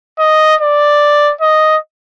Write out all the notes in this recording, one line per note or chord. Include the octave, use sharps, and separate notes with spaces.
D#5
D5
D#5